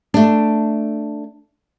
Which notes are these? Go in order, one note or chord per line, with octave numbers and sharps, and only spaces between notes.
A3 D4